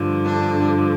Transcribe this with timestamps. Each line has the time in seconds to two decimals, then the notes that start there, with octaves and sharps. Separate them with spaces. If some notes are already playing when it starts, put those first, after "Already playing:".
Already playing: G2 D3 F3
0.25 D4